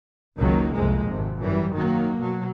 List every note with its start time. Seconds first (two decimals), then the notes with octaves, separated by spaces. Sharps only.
0.39 F#1 C#2 D#3 F#3 A#3
0.74 C2 F2 C3 G#3
1.06 G#1 C3
1.40 F#2 E3 G3
1.75 D#3 F#3 A#3
2.17 B2 F#3